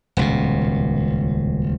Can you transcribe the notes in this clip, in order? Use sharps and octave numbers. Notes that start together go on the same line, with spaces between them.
D#1 C#2 B2